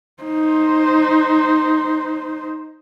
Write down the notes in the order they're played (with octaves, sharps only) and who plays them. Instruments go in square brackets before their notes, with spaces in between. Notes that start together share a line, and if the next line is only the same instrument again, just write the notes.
[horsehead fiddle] D#4 C5